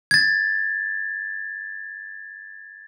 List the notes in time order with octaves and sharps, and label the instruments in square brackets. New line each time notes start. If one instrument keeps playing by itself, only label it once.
[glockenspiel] G#6 A6